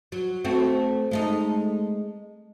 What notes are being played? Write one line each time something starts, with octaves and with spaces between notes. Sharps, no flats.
F#3
A3 C4 F#4
G#3 A3 D#4